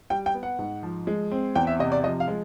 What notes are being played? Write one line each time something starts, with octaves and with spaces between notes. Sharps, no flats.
G3 G5
G5
B3
F#5
G#2
F3
G#3
C4
E2 G5
E5
C3 D#5
D5
F3 D#5
F5
G#3